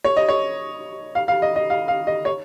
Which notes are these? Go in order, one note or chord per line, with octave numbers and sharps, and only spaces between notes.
C#5
D#5
C#5
F5
F5
D#5
D#5
F5
F5
D#5
C#5